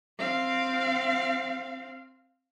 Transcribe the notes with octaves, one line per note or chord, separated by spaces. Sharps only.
C4 F5